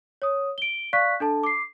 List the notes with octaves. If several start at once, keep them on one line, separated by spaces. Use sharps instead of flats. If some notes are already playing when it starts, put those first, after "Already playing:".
C#5 D#6
D7 G7
D5 F5 C#6 F#6 B6
D4 A4 A5
D6 C7